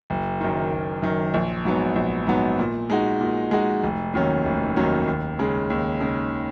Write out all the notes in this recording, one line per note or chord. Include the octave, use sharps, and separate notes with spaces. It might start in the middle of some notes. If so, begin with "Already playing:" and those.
F#1
F#2 D#3
F#1
F#2 D#3
A#1
G#2 F#3 B3
A#1
G#2 F#3 B3
A#2
G#3 D#4 F#4
A#2
G#3 D#4 F#4
F1
D#2 D#3 F#3 C#4
F1
D#2 D#3 F#3 C#4
D#2
C#3 G#3
D#2
C#3 G#3